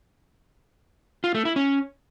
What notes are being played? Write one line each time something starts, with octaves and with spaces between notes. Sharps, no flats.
F4
A3
E4
C#4